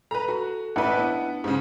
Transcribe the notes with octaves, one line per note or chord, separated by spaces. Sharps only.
A4 B4 A#5
F#4
A1 D4 E4 B4 F#5
B3
G#2 C#3